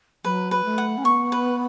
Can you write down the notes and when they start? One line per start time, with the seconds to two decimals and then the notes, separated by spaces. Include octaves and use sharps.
0.24 F#3 B4
0.51 B4
0.65 A3
0.78 F#5
0.97 C#4
1.04 B3 C#6
1.32 B4